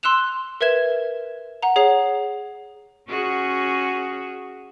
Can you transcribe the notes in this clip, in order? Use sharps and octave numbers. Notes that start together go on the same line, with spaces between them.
C6 E6 F#6 E7 F7
A#4 B4 E5 G#6 E7
F#5 A#5
G#4 C#5 C7
C#4 F#4 G#4